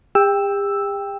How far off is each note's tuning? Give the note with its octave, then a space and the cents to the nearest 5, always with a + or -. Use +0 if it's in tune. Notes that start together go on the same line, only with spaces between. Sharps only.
G4 +45 G5 +15 E6 +0